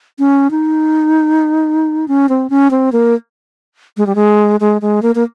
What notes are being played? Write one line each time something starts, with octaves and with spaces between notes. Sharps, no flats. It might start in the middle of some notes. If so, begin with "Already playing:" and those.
C#4
D#4
C#4
C4
C#4
C4
A#3
G#3
G3
G#3
G#3
G#3
A#3
A#3